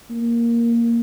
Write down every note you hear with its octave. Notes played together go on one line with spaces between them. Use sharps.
A#3